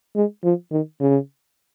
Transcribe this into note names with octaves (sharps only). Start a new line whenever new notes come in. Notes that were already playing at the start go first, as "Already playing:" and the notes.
G#3
F3
D#3
C#3